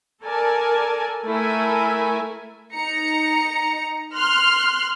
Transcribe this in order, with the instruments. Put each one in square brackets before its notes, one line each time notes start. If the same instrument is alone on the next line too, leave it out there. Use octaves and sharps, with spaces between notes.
[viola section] A4 A#4 D5 G#5 A5
A3 E4 A4 A#4 E5 G#5
[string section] D#4 A#5 C#7
C6 F6 F#6